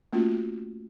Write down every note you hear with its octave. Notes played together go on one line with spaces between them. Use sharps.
A3 A#3 C#4 F4 F#4